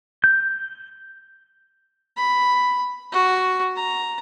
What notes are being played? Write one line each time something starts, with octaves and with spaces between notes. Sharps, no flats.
G6
B5
F#4
A#5